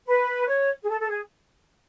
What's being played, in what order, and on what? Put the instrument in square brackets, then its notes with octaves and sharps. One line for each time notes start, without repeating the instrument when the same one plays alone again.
[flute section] B4
C#5
G#4
A4
A4
G#4